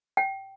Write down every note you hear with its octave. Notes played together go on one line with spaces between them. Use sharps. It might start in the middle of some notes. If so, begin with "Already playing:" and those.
G5